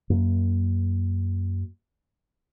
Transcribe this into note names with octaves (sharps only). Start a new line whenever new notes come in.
F#2 A#3